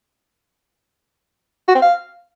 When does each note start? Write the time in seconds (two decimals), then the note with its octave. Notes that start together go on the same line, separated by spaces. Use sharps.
1.68 F#4
1.75 C4
1.82 F5